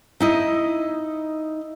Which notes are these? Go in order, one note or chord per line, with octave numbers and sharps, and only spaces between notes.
D#4 E4 D#5